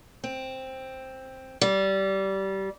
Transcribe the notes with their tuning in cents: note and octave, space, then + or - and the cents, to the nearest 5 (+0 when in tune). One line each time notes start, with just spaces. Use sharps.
C4 +5
G3 -20